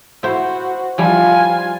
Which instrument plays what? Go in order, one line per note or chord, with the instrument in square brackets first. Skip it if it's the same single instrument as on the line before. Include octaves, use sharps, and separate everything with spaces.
[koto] E4 C5 [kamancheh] F#4
[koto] F3 G3 E4 [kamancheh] F4 G#5